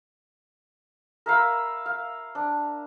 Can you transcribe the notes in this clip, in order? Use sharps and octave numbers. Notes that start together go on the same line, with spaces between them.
A#4 E5 F5 B5
F5
D4